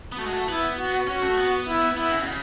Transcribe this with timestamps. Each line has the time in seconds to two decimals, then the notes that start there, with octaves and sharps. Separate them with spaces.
0.12 B3
0.18 A3 F#4
0.26 G#3
0.33 A3
0.48 B3 E4
0.78 F#4
1.07 C#4 F#4
1.22 A3
1.37 B3
1.67 E4
1.97 B3 E4
2.11 C#3
2.22 B2
2.27 C#3